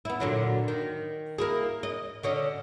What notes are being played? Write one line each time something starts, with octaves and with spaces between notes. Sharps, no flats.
B3 E4
A#2 D3 F#3
D#3
A#3 E4 G#4
D#5
D3 C#4 D#5